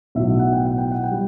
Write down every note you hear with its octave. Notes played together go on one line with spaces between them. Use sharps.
B1 A2 F#3 E5
F#5
G5
F#5
G5
F#5
G5
G3